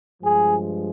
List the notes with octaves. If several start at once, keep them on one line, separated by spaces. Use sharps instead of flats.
G2 F3 G#3 G#4